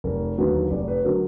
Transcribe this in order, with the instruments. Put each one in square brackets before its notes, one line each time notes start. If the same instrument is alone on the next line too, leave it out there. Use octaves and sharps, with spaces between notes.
[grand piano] F1 A#4
D#2 D3 F#3 B4
F1 D5
B4
D3 F#3 A#4